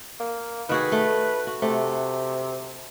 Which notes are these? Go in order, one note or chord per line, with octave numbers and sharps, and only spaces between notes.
A#3
D#3 F#4 G#4 B4
A3
F#4
C3 A3